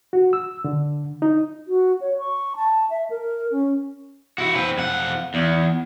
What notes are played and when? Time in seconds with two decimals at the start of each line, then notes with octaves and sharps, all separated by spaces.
0.13 F#4
0.33 E6
0.64 D3
1.22 D#4
1.66 F#4
2.01 C#5
2.19 C#6
2.56 A5
2.90 E5
3.10 A#4
3.52 C#4
4.38 E4 F#4
4.55 C4 B4
4.78 F2 F#5
5.34 E2